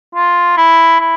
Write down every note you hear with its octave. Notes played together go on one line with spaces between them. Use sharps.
F4
E4
E4